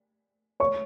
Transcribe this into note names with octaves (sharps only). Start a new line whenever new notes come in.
C#5 C#6